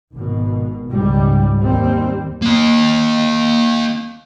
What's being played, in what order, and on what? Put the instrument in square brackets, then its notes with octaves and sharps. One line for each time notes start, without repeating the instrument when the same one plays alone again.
[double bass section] G#1 B2
C#2 G#2 G3
D#2 G3 C4
[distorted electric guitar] A#3 D#5